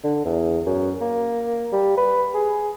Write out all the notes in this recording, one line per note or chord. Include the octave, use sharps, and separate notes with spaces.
D3
E2
F#2
A#3
G3
B4
G#4